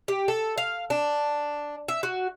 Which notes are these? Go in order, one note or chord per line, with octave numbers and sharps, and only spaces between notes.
G4
A4
F5
D4
E5
F#4